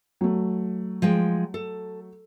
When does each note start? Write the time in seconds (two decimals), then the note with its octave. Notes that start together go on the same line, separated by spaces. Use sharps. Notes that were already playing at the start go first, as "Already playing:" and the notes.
0.21 F#3 A3
1.02 F3 G#3 G5
1.54 A4